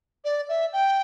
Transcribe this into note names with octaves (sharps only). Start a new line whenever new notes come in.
D5
E5
G5